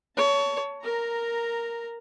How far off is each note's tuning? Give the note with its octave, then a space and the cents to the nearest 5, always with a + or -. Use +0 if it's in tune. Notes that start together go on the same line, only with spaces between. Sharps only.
C#5 +20 A5 +5
A#4 +0 A#5 -10